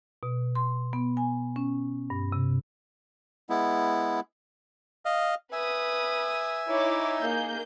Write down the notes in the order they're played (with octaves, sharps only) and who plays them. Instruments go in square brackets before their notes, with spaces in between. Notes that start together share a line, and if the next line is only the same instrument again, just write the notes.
[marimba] B2
C6
B3
G#5
C#4
G2
C3
[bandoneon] G#3 B3 E4
[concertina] D#5 F5
[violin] B4 D#6 [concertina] E5 G#5
[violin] D#4 [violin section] E4 C#5 D6
[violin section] A#3 G#4 G6